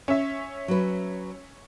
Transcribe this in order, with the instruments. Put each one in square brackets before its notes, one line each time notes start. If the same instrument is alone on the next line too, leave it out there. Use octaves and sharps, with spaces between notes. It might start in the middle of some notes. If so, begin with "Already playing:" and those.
[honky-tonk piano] C#4 E5
[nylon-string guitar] F#3 B4